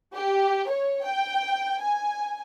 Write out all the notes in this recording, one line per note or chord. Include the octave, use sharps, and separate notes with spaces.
G4
C#5
G5
G#5